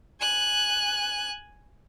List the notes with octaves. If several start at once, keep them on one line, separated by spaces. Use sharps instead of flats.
G#5 F#6